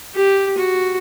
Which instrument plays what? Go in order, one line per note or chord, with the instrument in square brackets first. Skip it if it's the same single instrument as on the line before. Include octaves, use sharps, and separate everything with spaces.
[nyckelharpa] G4
F#4